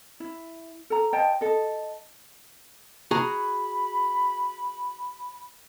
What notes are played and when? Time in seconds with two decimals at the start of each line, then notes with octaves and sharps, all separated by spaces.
0.20 E4
0.90 A4 A#5
1.13 C5 D#5 G5 A5
1.41 A4 D#5
3.11 F#4 G#4 A#5 B5